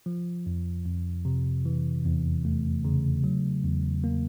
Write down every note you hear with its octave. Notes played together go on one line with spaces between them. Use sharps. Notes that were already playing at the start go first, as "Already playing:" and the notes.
F3
F2
F2
C3
E3
E2
A3
C#3
F#3
E2
A#3